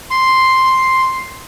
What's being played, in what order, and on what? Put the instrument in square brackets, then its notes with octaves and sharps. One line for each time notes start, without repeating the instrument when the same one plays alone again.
[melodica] C6